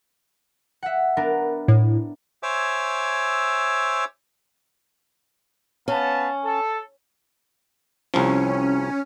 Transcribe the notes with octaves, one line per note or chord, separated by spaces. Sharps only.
E5 F#5
B3 D4 A#4
A2
C5 C#5 E5 G#5 D6 E6
B3 C#4 F5 A5
A4
C2 F3 C#4